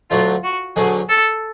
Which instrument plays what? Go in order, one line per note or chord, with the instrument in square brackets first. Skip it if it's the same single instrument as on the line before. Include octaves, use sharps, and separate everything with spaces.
[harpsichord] D2 D3 F#3 A3 [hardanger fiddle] F4
[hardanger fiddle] F#4
[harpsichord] D2 D3 F#3 A3 [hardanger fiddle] G#4
[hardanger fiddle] A4